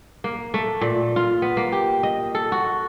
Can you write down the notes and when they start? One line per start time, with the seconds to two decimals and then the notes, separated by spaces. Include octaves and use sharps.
0.24 A#3
0.54 A3
0.81 A#2
1.16 F4
1.42 B3
1.57 A#3
1.72 G4
2.03 D#5
2.35 A4
2.52 F#4